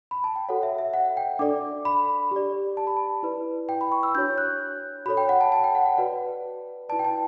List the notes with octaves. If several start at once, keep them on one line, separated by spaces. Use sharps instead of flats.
B5
A5
G5
F#4 A4 C#5 F#5
E5
E5
F#5
G5
D4 A4 D5 D6
B5
G4 D5
A5
B5
A5
E4 B4 D5
G5
B5
C#6
E6
D4 F#4 C#5 G6
F#6
F#4 A4 C#5 B5
G5
F#5
A5
A5
G5
F#5
F#5
F#4 B4 D5
E4 B4 D5 A5
G5
A5